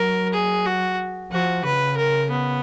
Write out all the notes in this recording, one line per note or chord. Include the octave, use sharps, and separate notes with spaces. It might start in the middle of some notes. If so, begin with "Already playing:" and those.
Already playing: F#3 A#4
G#4
F#4
F3 F#4
C#3 B4
A#4
B3